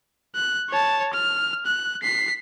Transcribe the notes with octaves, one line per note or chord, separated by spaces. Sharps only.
F#6
C#5 A5
F6
F#6
B6 C7